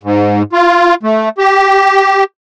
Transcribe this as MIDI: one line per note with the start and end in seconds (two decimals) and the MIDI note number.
0.03 0.42 44
0.53 0.94 65
1.03 1.29 57
1.38 2.24 67